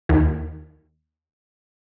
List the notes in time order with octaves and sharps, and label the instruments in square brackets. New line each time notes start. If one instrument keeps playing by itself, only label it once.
[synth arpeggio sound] D#2 D#3